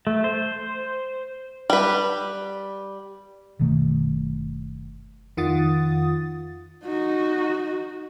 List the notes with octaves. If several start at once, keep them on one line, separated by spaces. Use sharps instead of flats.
A3
C5
G3 B4
F#1 B2 D#3 A3
F2 D#3 F4 F#5 D#6 A6
D#4 F#4